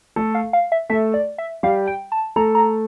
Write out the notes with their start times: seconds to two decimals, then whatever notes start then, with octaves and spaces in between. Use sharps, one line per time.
0.16 A3 A4
0.35 F5
0.53 F5
0.72 E5
0.90 A3 A4 E5
1.14 D5
1.38 E5
1.63 G3 G4 F5
1.87 G5
2.12 A5
2.36 A3 A4 A#5
2.55 A#5